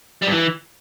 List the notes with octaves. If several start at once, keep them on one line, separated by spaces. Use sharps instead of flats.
G3
G2
E3